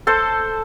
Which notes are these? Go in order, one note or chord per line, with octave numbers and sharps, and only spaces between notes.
A4 C5